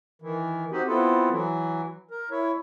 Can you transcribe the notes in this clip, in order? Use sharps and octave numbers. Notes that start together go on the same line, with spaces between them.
D#3 E3
C4 D#4 F#4 G4
B3 C4 E4 F4 A4
E3 F#3
A#4
E4 C#5